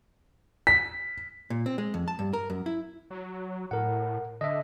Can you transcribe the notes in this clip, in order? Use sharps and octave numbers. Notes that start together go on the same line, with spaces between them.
B6
A#2
C4
G#3
F2
A5
G2
A#4
F#2
E4
F#3
A2 A#4 F#5
D3 D#5 E5